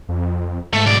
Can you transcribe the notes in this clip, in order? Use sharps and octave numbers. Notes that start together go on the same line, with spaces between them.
F2
G#2 A3
B1 D5